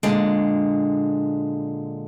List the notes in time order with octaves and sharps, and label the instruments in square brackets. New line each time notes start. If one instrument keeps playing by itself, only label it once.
[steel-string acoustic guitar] A#2 D3 G#3